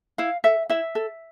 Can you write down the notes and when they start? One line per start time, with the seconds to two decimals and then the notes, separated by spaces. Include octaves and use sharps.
0.18 E4 F5
0.44 A4 E5
0.69 E4 E5
0.95 A4